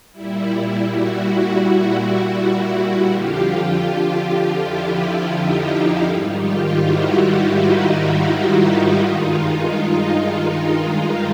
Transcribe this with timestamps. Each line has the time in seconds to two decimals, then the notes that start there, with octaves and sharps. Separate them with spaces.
0.13 A#2 G3 E4
0.86 E4 F#4
3.08 F2 D3 F3 F4 G4
3.82 F4 G4
4.57 E4
5.29 D#4 F4
6.03 G#2 D#3 G3
6.40 F4 G4
6.77 E4 F#4
7.51 D#4 F4
8.99 G2 D#3 G#3